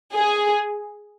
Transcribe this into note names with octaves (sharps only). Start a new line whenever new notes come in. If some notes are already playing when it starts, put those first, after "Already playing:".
G#4